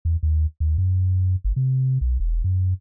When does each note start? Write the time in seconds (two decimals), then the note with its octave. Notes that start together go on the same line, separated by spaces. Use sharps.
0.05 E2
0.23 D#2
0.60 D#2
0.78 F#2
1.44 G1
1.56 C3
2.01 B1
2.20 E1
2.44 F#2